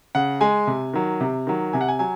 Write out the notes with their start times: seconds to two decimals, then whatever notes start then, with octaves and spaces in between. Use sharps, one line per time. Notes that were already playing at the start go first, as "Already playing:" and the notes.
0.15 C#3 F#5
0.41 G#3 G#5
0.67 C3
0.93 D#3 F#3
1.21 C3
1.47 D#3 F#3
1.73 C3 G#5
1.81 F#5
1.88 G#5
1.99 F#3 G#5